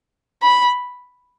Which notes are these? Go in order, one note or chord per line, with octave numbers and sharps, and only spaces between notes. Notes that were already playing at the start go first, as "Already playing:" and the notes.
B5